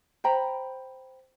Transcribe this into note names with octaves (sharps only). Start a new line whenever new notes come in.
C5 G5 A#5 B5